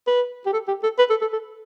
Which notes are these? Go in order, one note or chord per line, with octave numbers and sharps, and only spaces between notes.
B4
G4
A4
G4
A4
B4
A4
A4
A4